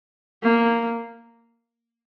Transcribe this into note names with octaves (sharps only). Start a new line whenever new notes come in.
A#3